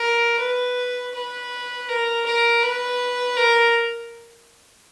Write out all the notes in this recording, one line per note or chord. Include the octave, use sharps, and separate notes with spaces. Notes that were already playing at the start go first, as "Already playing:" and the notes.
Already playing: A#4
B4
B4
A#4
A#4
B4
A#4